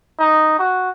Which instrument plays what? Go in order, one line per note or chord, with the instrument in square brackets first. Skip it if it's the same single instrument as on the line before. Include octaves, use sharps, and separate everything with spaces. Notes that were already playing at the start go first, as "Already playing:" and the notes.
[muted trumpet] D#4
F#4